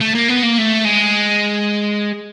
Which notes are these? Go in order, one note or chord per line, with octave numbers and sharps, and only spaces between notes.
A3
A#3
B3
A#3
A3
G#3